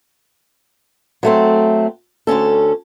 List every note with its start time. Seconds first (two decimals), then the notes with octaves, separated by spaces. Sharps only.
1.23 F#3 A3 C4
2.27 D2 G#2 C#4 A4